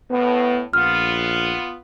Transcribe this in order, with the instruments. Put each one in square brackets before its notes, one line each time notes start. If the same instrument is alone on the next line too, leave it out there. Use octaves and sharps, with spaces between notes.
[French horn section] A2 [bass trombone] B3
[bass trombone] A#1 [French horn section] B3 F4 [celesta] F6